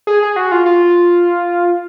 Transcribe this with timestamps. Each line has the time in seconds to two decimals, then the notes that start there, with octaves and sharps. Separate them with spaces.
0.07 G#4
0.23 G#4
0.36 F#4
0.52 F4
0.66 F4